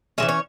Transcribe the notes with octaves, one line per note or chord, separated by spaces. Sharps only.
E3 G#3 C#4 E5
C#5